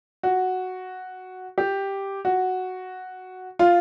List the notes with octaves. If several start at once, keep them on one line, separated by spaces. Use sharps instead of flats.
F#4
G4
F#4
F4